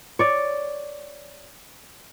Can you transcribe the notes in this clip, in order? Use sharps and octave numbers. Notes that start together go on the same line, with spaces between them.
C#5 D5